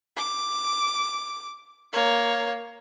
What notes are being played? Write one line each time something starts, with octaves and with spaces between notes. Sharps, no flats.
D6
A#3 C#5